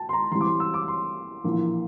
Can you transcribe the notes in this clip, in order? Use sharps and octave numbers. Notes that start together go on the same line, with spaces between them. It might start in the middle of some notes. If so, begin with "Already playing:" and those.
Already playing: G5 A5
C6
A#5
A1 A2 G3 C4 C6
D6
C6
E6
D6
C6
A#1 A2 E3 A#3